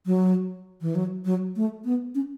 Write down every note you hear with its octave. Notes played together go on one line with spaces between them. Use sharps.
F#3
E3
F#3
F#3
A3
B3
C#4